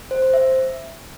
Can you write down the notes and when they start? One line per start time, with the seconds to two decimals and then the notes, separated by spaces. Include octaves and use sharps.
0.11 C5
0.22 C5
0.34 E5